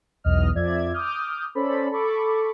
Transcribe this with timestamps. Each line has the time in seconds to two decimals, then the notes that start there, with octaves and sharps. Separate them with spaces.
0.24 B1 E2 D#5 F6
0.54 F2 F3 D5 E5 G#6
0.93 D6 D#6 F6 G6
1.55 C#4 A4 C5 D5 B5
1.91 A4 B5 C#6 D6